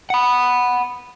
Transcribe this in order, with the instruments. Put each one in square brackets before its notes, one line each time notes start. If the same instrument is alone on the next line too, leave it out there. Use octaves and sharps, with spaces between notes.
[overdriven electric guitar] F#5 B5